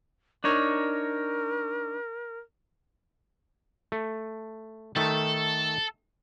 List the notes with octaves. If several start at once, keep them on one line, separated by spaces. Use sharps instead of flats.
D4 D#4 A#4 C#5
A3
D#3 A3 A4